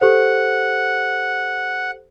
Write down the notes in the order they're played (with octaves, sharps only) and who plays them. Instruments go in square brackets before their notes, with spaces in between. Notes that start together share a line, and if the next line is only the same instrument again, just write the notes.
[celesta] G4 A4 C5 [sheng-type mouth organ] F#5